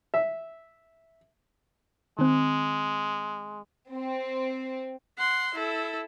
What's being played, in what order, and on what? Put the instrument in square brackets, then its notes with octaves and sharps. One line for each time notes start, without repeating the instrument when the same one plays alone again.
[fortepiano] E5
[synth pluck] D#3 C4 [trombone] G#3
[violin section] C4
[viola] F#5 C6
E4 A4